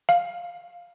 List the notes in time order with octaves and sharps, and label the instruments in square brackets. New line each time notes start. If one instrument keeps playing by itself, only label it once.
[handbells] F5